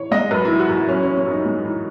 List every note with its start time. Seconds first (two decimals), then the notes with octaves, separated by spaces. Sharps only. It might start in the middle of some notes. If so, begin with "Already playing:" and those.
Already playing: E3 C#5
0.11 G#3 D#5
0.31 F#2 B4
0.45 E4
0.50 E3
0.60 F#4
0.69 F#2 E4
0.88 F#2 C#4
1.03 E3 C#4
1.17 C#4
1.26 F#2 D#4
1.45 G#3
1.65 E3